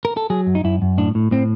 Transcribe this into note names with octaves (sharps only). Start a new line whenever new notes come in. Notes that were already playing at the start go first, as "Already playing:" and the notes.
A#4
A4
F#3 G#4
F#2
D#4
F#2 E4
F#2
A2 D4
A2
A2 C4